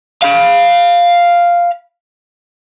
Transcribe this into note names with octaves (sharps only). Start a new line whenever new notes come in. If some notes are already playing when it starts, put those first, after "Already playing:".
F5 B5